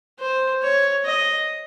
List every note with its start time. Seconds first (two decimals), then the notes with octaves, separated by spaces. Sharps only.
0.19 C5
0.62 C#5
1.05 D#5